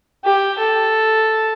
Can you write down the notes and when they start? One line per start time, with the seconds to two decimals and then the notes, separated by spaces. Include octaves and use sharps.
0.24 G4
0.58 A4